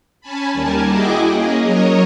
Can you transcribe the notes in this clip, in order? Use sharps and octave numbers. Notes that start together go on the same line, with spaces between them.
C#4 G#5 A5 B5
D#2 G3 A#4 G#5 A5
E4 F#4 G#4 D#5 G5 D6
A#3 C#4 G#4 D#5
F#3 A#4 C#5 D#5